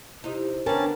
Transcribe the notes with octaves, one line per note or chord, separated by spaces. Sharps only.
C3 D#4 E4 G4
D3 B3 C#4 D4 A#4 G5 A5